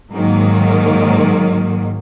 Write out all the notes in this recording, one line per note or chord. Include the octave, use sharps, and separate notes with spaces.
G#2 D#3 F#3 A#3